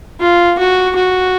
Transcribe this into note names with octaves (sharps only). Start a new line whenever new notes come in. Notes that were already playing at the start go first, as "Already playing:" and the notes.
F4
F#4
F#4